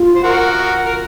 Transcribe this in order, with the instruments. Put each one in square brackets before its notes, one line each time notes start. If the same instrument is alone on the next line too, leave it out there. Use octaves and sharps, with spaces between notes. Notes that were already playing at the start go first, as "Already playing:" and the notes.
Already playing: [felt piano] F4
[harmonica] C5
F#4 A#4
A#4